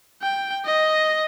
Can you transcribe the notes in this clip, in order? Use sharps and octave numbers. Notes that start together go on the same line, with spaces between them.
G5
D#5